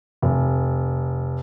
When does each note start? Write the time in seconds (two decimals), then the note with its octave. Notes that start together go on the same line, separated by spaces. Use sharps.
0.22 F1